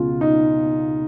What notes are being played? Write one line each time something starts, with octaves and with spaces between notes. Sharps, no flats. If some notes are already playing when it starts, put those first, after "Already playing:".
Already playing: C#2 B2 F4
D#4